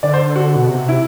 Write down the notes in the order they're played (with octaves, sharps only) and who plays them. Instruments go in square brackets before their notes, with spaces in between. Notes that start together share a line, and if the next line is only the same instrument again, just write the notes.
[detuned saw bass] D3 [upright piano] D5
[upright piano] C5
F#4
[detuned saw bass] B2
C3
[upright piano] E4